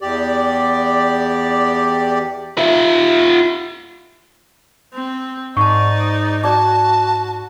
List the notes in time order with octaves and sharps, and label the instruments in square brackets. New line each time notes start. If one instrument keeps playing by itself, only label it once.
[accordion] E2 G4 D5
[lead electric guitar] F4 E5
[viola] C4
[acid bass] G#2 [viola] D#4 D5 [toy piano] A5 C#6
[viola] F#4 [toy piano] D5 D6 [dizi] A5